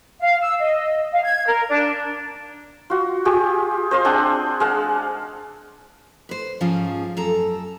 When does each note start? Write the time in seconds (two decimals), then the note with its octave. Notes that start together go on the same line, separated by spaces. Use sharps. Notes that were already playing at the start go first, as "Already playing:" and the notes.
0.20 F5
0.41 E6
0.59 D#5
1.12 F5
1.23 G#6
1.46 A#4
1.69 D4
2.90 F4 F#4
3.25 F4 G4 G#4
3.91 C5 D#5 F5 C6
4.05 C4 D4 G#4 F#5
4.60 G#3 F5 F#5 A5
6.29 B4 C5
6.60 G#2 F3 C#4 F4 G#4
7.17 F#2 A4 A#5